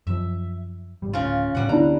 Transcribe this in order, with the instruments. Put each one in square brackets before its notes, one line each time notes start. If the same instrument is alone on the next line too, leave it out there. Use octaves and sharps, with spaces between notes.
[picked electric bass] F#2 F3 [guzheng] E5
[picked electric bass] G#1 G3
[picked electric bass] D1 A3 [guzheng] C#3 F4
[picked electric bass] A2 C#3 [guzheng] G3 F#5
[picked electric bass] D2 D3 B3 [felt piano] D4 E4 [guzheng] A#5